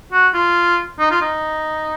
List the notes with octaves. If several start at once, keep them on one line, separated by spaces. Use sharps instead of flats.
F#4
F4
D#4
F4
D#4